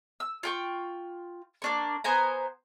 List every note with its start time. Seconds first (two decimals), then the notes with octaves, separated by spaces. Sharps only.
0.20 E6
0.43 F4 G5 C#6
1.62 A#3 D4 C#6
2.04 B3 C5 G#5 A#5